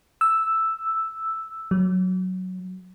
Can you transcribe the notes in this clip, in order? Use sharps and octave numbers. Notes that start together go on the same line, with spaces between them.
E6
F#3